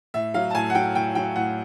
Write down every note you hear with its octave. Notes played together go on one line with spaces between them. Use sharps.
A2 E5
F#3 F5
A5
A2 G#5
F#5
F#3 G5
A2 G5
F#3 G5
A2 F#5